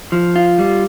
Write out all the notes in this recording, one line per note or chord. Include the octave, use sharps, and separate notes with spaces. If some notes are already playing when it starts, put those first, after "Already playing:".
F3
F4
G3